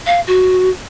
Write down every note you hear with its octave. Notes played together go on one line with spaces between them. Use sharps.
F5
F#4